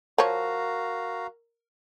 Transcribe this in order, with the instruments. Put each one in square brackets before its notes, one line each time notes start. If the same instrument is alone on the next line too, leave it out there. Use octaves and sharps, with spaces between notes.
[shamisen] F3 C#5 [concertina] F#4 F5 A#5 [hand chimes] A#4